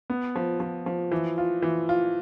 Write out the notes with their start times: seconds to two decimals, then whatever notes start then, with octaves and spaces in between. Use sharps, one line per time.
0.10 B3
0.36 F3
0.60 F3
0.86 F3
1.12 E3
1.38 F4
1.62 E3
1.89 F4